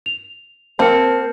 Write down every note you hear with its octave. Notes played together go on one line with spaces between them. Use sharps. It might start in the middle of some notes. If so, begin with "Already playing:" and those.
F7
A#3 C4 A#4 A5 F6 C#7